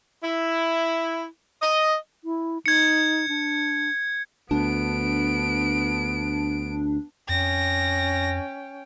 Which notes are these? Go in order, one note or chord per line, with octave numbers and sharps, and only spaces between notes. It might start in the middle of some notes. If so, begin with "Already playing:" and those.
E4
D#5
E4
D#4 G#6 C#7
D4
D2 B3 D4 D7
F2 C#4 G5 A#6